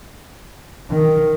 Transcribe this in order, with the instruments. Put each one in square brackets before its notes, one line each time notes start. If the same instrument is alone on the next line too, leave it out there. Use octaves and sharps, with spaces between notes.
[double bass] D#3